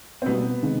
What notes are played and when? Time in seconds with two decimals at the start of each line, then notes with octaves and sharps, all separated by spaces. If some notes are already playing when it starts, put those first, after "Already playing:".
0.22 C4
0.26 B2 G3 A#3 B3
0.62 C3 D#3 G#3